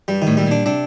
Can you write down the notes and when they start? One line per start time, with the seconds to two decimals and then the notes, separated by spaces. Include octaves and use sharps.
0.08 G2 G3
0.22 A2 D#3
0.37 A2 G3
0.46 A#2 D4
0.66 C3 D4